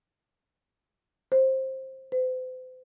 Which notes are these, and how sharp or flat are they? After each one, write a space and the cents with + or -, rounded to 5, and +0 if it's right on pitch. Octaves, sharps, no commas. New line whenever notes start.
C5 +15
C5 -40